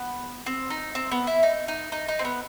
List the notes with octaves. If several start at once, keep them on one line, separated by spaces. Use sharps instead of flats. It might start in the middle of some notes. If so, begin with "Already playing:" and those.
Already playing: B3
C4
D#4
C4
B3
E4
D#4
D#4
D#4
D#4
C4
B3